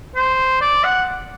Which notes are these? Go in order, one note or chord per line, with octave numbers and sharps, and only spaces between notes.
C5
D5
F#5